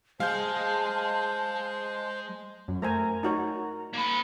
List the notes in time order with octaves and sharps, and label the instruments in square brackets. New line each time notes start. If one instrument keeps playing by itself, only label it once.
[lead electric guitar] G#3 G#4 [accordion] C5 [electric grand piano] F5 G6 [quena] A5
[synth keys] F#2
[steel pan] A3 C5 G#5 [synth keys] A#4 A#5
[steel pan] D#4 F#4 C#5
[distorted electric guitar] A#3 B5